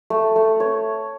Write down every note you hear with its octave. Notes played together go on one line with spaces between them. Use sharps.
A3
A3
C#5